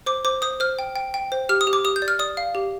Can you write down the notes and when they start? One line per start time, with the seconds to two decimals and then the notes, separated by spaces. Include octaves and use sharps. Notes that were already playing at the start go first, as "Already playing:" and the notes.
0.06 C5 D6
0.25 C5 D6
0.42 C5 D#6
0.60 C5 F6
0.79 G5
0.96 G5
1.14 G5
1.32 C5
1.49 G4 F6
1.61 D#6
1.67 G4
1.73 D6
1.85 G4 D#6
1.96 G6
2.02 D5
2.08 F6
2.19 D5 D#6
2.37 F5
2.55 G4